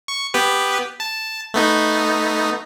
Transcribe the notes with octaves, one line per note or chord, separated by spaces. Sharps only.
C#6
B3 G4 B4
A5
A3 B3 D#4